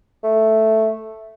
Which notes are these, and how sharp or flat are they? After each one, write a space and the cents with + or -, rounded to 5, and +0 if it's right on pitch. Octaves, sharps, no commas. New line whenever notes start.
A3 +0